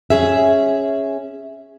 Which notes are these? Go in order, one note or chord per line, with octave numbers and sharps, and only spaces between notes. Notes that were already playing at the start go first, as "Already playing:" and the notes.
C#4 G#4 E5